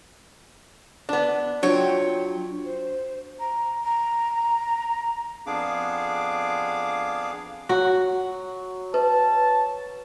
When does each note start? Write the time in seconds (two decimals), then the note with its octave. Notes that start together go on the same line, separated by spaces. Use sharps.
1.09 B3 D4
1.63 F#3 D4 F4 C#5 G5
2.64 C5
3.39 A#5
3.83 A#5
5.47 F2 B3 D4 G#4 F5 D6
7.69 F#3 F#4
8.94 B4 A5